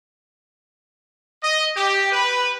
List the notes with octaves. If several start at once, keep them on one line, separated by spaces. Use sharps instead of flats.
D#5
G4
B4